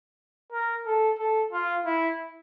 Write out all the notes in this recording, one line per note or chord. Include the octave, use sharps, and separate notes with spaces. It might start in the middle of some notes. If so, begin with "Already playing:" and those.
A#4
A4
A4
F4
E4